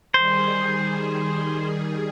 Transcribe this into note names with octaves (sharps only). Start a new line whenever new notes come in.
D#3 G3 G#4 C5